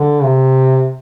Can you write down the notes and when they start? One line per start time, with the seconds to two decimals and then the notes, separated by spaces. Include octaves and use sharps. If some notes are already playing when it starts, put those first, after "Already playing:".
Already playing: D3
0.24 C3